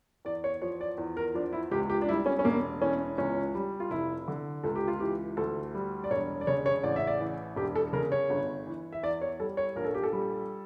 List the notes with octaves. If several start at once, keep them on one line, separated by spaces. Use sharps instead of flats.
E2 D5
C#5
F3 C#5
D5
E2
A#4
F3 D4
E4
C#2 G4
G4
D4
G3 E4
C#4
C#4
E1 A#3
E3 C#4
C#2 C#4
G3
F4
F1 E4
D3
C#2 A4
G4
F4
E3 G4
D2 A4
G3
D5
E1 C#5
D5
C#3 C#5
C#5
A1 D5
E5
D5
E3
E1 G4
A4
C#3 A#4
C#5
G1
E3
E5
E2 D5
C#5
G3 A4
C#5
A#1 A#4
A4
G4
A4
G3